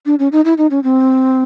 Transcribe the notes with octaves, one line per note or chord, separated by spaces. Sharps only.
D4
C#4
D#4
E4
D#4
C#4
C4